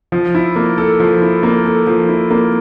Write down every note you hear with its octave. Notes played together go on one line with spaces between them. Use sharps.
F3
E4
A#3
A4
F3
E4
A#3
A4
F3
E4
A#3